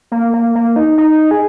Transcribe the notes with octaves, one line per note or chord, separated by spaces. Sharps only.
A#3
A#3
A#3
D#4
D#4
G#4